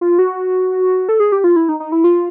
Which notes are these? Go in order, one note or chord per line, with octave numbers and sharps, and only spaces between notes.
F4
F#4
A4
G#4
G4
F4
E4
D#4
D#4
E4
F4